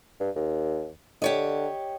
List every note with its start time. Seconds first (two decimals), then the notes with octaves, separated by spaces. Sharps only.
0.20 G2
0.36 D#2
1.22 D3 G4 C#5 D#5